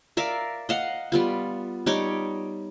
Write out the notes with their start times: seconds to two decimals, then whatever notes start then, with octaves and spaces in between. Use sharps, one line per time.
0.17 A#4 D5 E5 F5
0.69 D#5 F5 F#5
1.12 G3 B3 F4
1.86 G3 D#4 C#5 D6